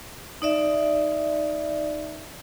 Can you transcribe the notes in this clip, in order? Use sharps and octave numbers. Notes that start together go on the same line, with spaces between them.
D#4 D5 E5